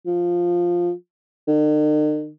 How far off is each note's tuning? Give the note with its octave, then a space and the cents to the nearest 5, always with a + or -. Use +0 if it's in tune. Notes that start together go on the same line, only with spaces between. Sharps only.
F3 +5
D#3 -45